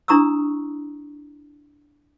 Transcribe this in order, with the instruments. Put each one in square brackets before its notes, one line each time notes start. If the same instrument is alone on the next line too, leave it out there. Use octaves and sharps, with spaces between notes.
[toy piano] D4 E4 A#5 C#6 D#6 E6